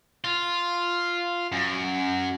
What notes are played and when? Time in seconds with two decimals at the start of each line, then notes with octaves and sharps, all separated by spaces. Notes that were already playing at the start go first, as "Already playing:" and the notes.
0.24 F4
1.52 F#2